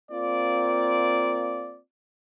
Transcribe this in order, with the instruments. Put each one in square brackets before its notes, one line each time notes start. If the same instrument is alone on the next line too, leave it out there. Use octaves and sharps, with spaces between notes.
[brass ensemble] A#3 C4 F4 D5